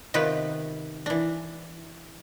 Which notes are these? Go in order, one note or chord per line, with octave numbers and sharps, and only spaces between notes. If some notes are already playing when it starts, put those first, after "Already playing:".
C3 D#3 B3 F4 B4
E3 D4